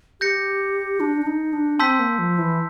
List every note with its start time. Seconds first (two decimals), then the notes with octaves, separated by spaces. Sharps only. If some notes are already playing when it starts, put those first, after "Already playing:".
0.21 G4 G6 A#6 C#7
1.00 D4
1.21 D4
1.27 D#4
1.53 D4
1.79 C4 A5 C6 E6 G6 B6
1.99 A#3
2.19 F3
2.38 E3